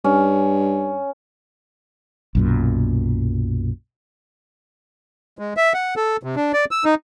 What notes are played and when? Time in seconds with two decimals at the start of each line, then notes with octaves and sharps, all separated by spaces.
0.04 G2 C#4
2.35 B1 F#2 A#2
5.39 G#3
5.57 E5
5.74 F#5
5.97 A4
6.23 C3
6.36 D4
6.53 D5
6.71 E6
6.85 D#4